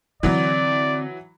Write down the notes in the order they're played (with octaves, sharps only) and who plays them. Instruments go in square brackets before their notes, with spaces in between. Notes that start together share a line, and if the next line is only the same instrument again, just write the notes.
[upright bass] D3 C4 [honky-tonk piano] E3 F#3 [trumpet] D5